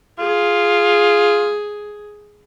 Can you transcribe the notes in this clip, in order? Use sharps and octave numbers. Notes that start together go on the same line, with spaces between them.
F4 G#4